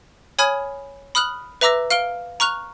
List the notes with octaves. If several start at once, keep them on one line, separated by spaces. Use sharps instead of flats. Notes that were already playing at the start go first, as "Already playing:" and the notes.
C#5 G#5 B5 D#6 F6 G#6
B5 D#6 F6 F#6 F#7
B4 E5 A#5 D6 E6 A#6
F5 F6 D7 G7
A#5 C#6 F6 F#6 F7